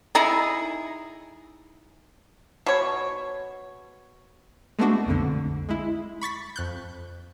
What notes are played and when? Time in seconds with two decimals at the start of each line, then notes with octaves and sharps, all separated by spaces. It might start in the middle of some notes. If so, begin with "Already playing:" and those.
0.15 D#4 E4 G#4 A#5
2.66 B2 C#5
4.79 G#3 A3 B3 D4 F#4
5.06 B1 F2 D3
5.69 G#3 E4
6.21 B5 C#6 A6 B6
6.56 F2 F#6 G6